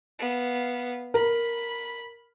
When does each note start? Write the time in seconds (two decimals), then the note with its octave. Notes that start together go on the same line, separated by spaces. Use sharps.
0.19 B3 F5
1.14 A#4 B5